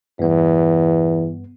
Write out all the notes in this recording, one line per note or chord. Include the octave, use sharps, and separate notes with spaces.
E2 G2 B3